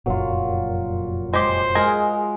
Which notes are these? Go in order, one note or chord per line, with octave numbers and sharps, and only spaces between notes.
F1 F#2 A#2 F#3 F4
G#3 G4 C5
G#3 G#4 A#4